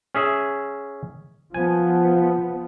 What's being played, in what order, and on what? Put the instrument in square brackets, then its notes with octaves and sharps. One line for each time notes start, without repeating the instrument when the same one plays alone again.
[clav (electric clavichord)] C#4 G#4 E5
[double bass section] F3 B3 [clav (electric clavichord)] G#5